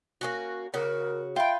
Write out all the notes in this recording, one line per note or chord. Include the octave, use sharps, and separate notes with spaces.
A#3 C#4 F#4
C#3 F#4 A#4
F4 B4 E5 G5